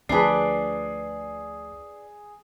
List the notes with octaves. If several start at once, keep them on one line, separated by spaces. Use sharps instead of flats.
D2 F3 D4 G#4 B4 C7